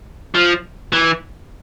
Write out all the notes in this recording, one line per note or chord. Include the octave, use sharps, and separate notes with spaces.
F3
E3